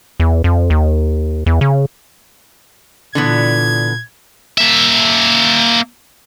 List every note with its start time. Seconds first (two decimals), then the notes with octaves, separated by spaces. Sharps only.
0.20 E2
0.44 F2
0.70 D#2
1.46 E2
1.61 C#3
3.15 A#2 D3 E3 B3 G#6
4.58 A#3 E5